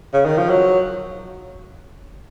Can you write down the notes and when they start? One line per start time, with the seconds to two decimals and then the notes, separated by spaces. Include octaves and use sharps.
0.14 C#3
0.25 D#3
0.38 F3
0.50 F#3